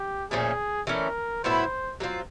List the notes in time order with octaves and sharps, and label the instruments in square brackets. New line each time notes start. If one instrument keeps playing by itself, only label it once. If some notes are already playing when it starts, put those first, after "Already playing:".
Already playing: [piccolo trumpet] G4
[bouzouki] A#2 F3 A3 C#4 [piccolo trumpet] G#4
[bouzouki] E3 A3 C#4 [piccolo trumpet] A#4
[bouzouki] A2 F#3 B3 E4 [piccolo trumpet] C5
[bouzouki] F#3 A3 C4 F4